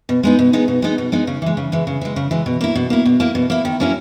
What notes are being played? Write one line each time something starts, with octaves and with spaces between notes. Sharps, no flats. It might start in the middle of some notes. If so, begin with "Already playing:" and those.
B2
G#3 B3 D#4
B2
G#3 B3 D#4
B2
G#3 B3 D#4
B2
G#3 B3 D#4
C#3
E3 G#3
C#3
E3 G#3
C#3
E3 G#3
C#3
E3 G#3
B2
A#3 E4
B2
A#3 E4
B2
A#3 E4
B2
A#3 E4
D#3
F#3 A#3 C#4 E4